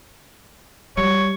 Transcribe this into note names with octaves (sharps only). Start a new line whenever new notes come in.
G3 C#5